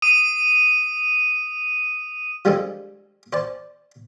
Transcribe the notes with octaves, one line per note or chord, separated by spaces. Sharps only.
D#6 D#7
F3 G3 G#3 D4 G#4 A4
C5 D5 A5